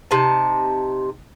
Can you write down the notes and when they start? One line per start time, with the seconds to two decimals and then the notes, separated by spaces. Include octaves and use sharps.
0.11 C3 D#4 A5